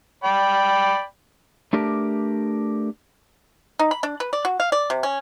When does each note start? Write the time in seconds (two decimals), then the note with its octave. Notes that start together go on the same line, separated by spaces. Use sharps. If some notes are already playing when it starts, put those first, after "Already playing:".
0.24 D5 G5 B5
1.73 A3 D4 G4 A#4
3.79 D#4
3.91 B5
4.03 D4
4.20 B4
4.33 D5
4.45 F#4
4.60 F5
4.72 D5
4.90 C3
5.03 C#4